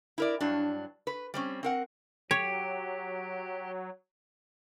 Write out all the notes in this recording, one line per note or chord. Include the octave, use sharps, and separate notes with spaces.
E4 A#4 D5
G2 F#3 D4
B4
G3 C4 C#4
C4 A#4 F#5
F#3 G4 C#5